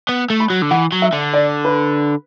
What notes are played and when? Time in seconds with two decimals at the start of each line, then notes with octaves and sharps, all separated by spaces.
0.09 B3
0.30 A3
0.40 B5
0.50 F#3
0.62 D3
0.71 E3 F#5
0.92 F#3
1.02 E5
1.13 D3
1.33 D5
1.65 B4